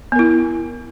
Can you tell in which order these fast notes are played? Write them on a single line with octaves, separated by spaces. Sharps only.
B3 A#4 E4